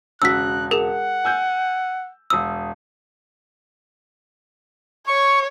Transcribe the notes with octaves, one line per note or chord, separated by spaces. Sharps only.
E1 C#3 F#4 E6 F#6 B6
G#4 A#4 F#5
G#5 E6 G6
E1 D#6 E6
C#5 C#6